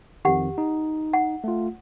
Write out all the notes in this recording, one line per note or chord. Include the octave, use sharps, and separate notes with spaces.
F2 D#3 G4 F#5
D#4
F#5
A3 F4